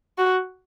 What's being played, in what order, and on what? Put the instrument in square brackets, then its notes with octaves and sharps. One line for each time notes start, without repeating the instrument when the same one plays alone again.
[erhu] F#4